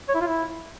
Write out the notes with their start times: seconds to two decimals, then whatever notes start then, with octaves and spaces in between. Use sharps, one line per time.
0.09 C#5
0.15 E4
0.21 F4
0.27 E4